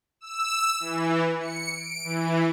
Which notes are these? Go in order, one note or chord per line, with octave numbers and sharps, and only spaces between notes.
E6
E3
C#7
D7
E3